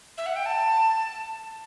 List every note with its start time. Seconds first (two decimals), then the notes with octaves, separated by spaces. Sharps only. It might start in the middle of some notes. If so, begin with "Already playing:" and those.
0.18 E5
0.26 F#5
0.36 G5
0.46 A5